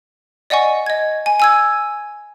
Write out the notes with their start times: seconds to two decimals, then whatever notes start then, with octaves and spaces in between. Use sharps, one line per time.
0.50 D5 D#5 F#5 G#5 C#6
0.86 D#5 G#6
1.26 G#5
1.40 G#5 E6 G#6